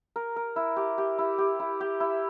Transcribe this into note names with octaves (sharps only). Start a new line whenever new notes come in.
A#4
A#4
E4
G4
G4
E4
G4
E4
G4
E4